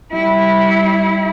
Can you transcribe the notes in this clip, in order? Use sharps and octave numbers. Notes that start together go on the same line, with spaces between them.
G3 E4